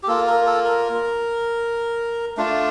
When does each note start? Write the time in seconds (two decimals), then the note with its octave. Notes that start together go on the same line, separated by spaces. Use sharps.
0.03 G4
0.07 A#3 F4 A4
0.27 A#4
0.46 A4
0.65 A#4
2.37 A3 D4 F4